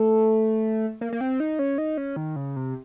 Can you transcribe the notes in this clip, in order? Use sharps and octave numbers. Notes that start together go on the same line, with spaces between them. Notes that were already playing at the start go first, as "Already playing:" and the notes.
Already playing: A3
A#3
A#3
C4
D#4
C#4
D#4
C#4
D#3
C#3
C3